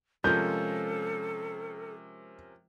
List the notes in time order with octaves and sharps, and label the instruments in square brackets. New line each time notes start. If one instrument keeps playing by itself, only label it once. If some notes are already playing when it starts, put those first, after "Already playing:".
[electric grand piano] C3 C#4 A#4 [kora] F3 G#3 [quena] A4 [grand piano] G6